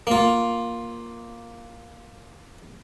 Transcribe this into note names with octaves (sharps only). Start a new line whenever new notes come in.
A#3 F4